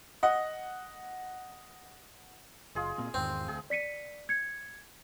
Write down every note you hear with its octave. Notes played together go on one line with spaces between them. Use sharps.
D#5 F#5
F#1 F4 G#4 D#5
A#2 A#3 C4
E2 G#2 D#3 C4
D2 G#4
D5 B6 C#7 D#7
G#6 C#7